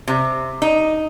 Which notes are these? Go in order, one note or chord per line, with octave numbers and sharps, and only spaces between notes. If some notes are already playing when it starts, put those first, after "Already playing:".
C3
D#4